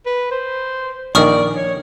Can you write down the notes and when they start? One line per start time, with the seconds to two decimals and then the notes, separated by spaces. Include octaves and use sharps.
0.06 B4
0.31 C5
1.15 A#1 D#3 D5 C#6 D#6 F6
1.56 C#5